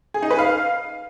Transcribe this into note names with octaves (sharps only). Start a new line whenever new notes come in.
G#4
D#4
B4
F5